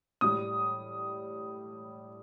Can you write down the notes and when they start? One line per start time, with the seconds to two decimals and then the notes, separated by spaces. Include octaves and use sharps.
0.21 A2 G3 D#6